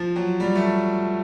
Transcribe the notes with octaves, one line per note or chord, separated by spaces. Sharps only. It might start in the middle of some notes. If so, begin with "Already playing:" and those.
Already playing: F3
F#3
G3
A3